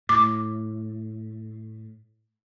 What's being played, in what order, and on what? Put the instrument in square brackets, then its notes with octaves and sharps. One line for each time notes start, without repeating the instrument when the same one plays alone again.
[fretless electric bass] A2 [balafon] D6